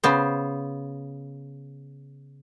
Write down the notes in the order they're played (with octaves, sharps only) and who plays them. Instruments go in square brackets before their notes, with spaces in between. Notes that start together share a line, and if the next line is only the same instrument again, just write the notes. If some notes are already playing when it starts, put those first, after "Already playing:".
[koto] C#3 B3 C5